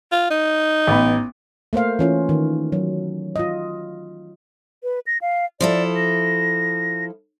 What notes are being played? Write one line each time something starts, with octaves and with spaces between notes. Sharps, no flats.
F4
D#4
A1 B3 B5
A3 A#3 C5 F5
E3 C#4 F4
D#3
F#3
F4 D#5
B4
A#6
F5
F3 E4 A4 D5
A#6